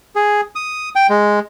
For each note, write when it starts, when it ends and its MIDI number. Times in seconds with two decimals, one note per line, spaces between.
0.16 0.41 68
0.55 0.89 87
0.96 1.07 79
1.10 1.39 56